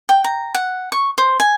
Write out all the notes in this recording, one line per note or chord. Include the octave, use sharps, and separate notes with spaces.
G5
A#5
F#5
C#6
C5
G#5